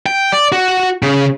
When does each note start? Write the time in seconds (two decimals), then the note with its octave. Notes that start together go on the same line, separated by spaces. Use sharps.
0.06 G5
0.32 D5
0.52 F#4
1.03 C#3